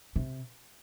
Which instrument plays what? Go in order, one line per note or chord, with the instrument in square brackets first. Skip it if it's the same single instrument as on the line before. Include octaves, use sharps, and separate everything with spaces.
[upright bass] C3